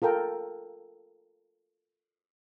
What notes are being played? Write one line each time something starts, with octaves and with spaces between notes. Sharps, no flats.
F4 A4 A#4 G5 A#5